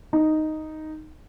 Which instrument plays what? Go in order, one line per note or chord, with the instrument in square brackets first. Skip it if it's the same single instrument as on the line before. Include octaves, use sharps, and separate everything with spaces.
[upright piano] D#4